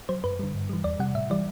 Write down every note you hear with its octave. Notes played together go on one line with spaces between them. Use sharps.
F#3 C5
F#2 B4
D3 G3
G2
E3 G3
E2 D5
C3 G3 F#5
A2 E5
E3 G3 D5